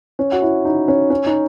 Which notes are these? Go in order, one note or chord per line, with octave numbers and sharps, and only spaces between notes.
C#4
F#4
E4
D#4
C#4
C#4
D#4